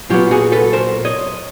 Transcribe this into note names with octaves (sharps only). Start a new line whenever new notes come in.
A#2 F#3 B3 F4 G4
F#4 G#4
A4 B4
A#4 C5
C#5 D#5